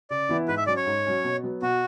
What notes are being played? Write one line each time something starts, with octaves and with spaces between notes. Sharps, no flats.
C#3 D5
E3 B3 E4
G#2 B4
E5
F#3 C#4 D5
C#5
G#2
F#3 C#4
B2
F#3 B3
B2 F#4